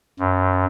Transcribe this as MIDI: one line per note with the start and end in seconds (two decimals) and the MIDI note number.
0.19 0.65 42